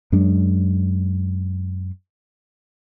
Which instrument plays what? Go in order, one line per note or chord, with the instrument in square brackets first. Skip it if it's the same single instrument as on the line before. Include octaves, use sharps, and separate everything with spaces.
[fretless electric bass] F#2 F#3 G#3 D4